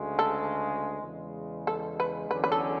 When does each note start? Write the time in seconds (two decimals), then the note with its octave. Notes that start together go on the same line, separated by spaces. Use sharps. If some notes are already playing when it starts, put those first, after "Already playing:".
Already playing: D2 C#3 G#3
0.19 A4
1.04 E2 C#3 G#3
1.67 A4
2.00 B4
2.31 E2 D3 F#3 C#4 B4
2.44 B4
2.52 A4